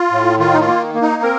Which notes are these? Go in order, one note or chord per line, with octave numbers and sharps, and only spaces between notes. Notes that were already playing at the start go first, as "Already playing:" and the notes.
Already playing: F4
A2
D#3 F4
D#4
F4
A#3
A#3
D#4
C4 A#4